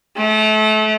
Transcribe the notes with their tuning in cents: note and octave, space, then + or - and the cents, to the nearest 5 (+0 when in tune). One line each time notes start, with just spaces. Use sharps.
A3 -30